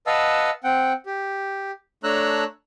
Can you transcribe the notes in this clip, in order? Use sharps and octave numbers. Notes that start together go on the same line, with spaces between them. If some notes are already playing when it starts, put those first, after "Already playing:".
B4 D#5 F5 F#5 A5 E6
C4 F#5 G5
G4
A3 D4 C#5 A#5 E6 F#6